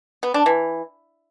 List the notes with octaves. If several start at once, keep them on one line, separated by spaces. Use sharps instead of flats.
B3
D4
E3